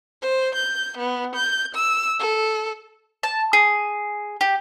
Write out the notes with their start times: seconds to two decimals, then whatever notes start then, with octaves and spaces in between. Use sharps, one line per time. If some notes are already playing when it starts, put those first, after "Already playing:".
0.22 C5
0.55 G6
0.98 B3
1.36 G6
1.75 E6
2.20 A4
3.23 A5
3.53 G#4
4.41 G4